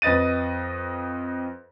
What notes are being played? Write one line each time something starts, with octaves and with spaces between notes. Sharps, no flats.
F2 B4 D#5 A6 D#7